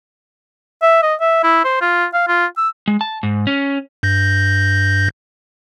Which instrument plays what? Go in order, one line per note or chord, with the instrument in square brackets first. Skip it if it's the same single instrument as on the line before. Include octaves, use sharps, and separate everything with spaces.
[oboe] E5
D#5
E5
E4
C5
F4
F5
F4
E6
[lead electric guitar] G#3
A5
G#2
C#4
[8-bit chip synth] G2 G6 A#6